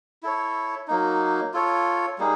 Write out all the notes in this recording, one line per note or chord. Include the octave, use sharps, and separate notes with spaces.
E4 A4 C#5
F#3 A#3 D#4
F4 A4 C#5
G3 A#3 D#4 G#4